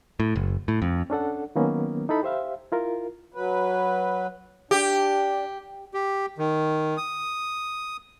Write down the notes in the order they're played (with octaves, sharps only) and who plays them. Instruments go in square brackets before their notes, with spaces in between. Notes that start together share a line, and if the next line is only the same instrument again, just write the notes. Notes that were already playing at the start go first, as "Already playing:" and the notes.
[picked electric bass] A2
F#1
A2
F2
[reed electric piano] C#4 D4 A4 F#5
D#3 F#3 A#3 B3 C#4
D#4 E4 A4 B5
G4 C5 E5 F5
E4 F4 A#4
[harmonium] F#3 B4
[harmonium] D4 [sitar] G4
[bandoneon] G4
D#3
D#6